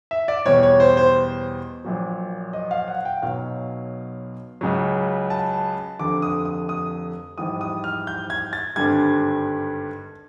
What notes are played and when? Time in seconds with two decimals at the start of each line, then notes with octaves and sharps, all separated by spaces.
0.11 E5
0.28 D5
0.45 E2 B2 G3 C#5
0.63 C#5
0.80 C5
0.97 C5
1.84 A#1 A#2 F#3
2.53 D#5
2.71 F5
2.88 F#5
3.05 G5
3.22 B1 B2 F#3 F5
4.61 C#2 C#3 F#3
5.30 A5
5.99 F1 F2 D3 D6
6.22 D#6
6.45 D#6
6.69 D#6
7.38 A#1 G#2 E3 G3 D#6
7.61 D#6
7.84 F6
8.07 G6
8.30 G#6
8.53 A6
8.76 G#1 G2 D3 G3 G#6